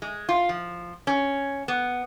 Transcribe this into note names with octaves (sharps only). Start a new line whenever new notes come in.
G#3
F4
F3
C#4
B3